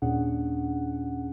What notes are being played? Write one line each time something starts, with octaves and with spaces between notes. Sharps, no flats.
D#2 A#2 C#4 D4 G#4 F#5